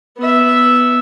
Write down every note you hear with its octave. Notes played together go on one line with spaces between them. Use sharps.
B3 E5